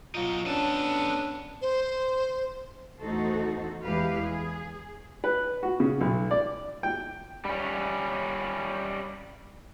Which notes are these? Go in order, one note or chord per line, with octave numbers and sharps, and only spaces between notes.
F#3 D#4 F4
B3 C#4 D4 A4
C5
E2 A3 D#4 F#4 A4 C5
E2 G#3 E4 G4 B4 F5
G#4
B4
F#4
C#3
B1
D5
G5
G3 C#4